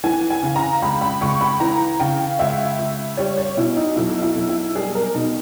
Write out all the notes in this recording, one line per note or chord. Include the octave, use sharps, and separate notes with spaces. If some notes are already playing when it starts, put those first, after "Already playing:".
E3 G#5
G#5
C#3
A#5
C#2 B5
B5
C#2 C#6
B5
E3 A#5
C#3 G5
C#2 E5
C#2
G3 C#5
C#5
B2 E4
D#4
B1 E4
E4
B1
E4
G3 G#4
A#4
B2 D#4